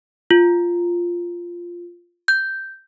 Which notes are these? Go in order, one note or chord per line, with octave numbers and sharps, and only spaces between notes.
F4
G6